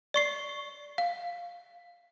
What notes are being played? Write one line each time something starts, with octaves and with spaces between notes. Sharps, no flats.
D5 C#6 C7
F5